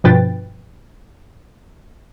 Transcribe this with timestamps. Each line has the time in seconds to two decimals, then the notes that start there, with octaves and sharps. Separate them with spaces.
0.04 G2 B2 F3 B4 G5 A6